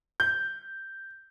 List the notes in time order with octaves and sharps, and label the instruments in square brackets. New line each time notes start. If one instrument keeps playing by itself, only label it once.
[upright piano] G6